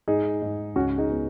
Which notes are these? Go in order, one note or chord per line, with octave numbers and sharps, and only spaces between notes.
G#2 D#4 G#4
G#2
C#2 C#4 F#4
D#4 G#4
B3